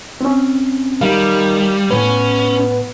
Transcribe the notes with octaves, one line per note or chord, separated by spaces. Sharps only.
C4 C#4
D#3 G3 F5
A2 B3 C#4 B4